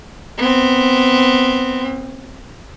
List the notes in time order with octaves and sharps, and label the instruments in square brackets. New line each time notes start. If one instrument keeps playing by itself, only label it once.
[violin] B3 C4